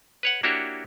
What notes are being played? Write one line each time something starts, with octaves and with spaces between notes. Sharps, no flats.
B4 C#5 F#5
A#3 D4 E4 F#4 G4 C#5